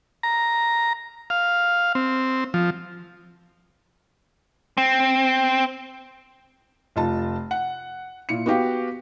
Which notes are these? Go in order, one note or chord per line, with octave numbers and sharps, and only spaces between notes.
A#5
F5
C4
F3
C4
F1 F4 A5
F#5
A#2 E4 C#7
B3 F#4 G4 F5